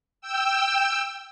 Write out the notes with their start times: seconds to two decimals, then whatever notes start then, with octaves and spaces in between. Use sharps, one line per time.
0.21 G5 E6